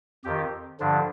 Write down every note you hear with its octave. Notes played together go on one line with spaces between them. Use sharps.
F2 D#3 G4
G2 D3 F3 D4